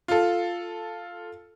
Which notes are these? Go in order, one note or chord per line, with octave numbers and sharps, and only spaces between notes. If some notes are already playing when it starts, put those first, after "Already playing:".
F4 A4